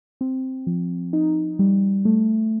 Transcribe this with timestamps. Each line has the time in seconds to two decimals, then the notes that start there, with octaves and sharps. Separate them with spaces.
0.21 C4
0.67 F3
1.13 D#4
1.59 G3
2.05 A3